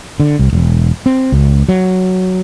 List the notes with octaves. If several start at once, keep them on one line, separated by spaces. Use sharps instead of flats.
D3
C2
E1
C4
C#2
F#3